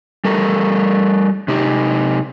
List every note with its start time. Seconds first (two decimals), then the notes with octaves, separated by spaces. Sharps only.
0.24 G3 A4 A#4
1.48 C3 D#4 G4